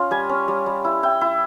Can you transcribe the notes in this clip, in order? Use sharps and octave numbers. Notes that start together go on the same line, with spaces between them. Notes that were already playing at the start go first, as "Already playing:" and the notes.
Already playing: C#4 F4
G3 G#5
C#4
G3
G3
E4
E4 G5
E4